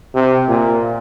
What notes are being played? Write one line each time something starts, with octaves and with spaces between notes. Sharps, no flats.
C3
A#2